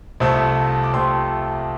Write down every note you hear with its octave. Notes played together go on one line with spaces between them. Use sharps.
C2 C3 F3 A3 C4
D6
C2 C3 F3 A3 C4 G5 C6